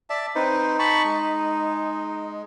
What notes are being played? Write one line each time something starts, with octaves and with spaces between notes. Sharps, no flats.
D5 E5 A5
C4 D#4 B4 C5
A5 B5 C#6
G#3